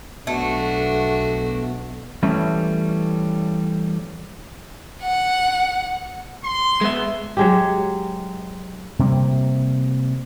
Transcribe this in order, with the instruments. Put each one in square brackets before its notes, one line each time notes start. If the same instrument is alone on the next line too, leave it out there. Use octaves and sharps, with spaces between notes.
[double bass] B1 [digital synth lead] B2 [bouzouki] A3 [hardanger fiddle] D4 F#4
[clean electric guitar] E3 G3 A3 C#4
[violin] F#5
[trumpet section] C6
[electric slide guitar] G#3 B3 E5
[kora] F#3 G#3 G4
[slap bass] C3 G3 A#3